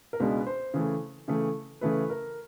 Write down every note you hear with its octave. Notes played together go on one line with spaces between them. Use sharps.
A#4
C#2 B2 G#3 B3 D4 B4
C5
C#3 E3 A3
C#3 E3 A3
C#3 E3 A3 B4
A#4